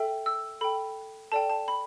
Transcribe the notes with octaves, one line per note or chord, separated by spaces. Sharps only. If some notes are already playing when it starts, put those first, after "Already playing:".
Already playing: A4 E5 G5
E6
A4 G5 B5
A4 D5 G5 A5
A5
B5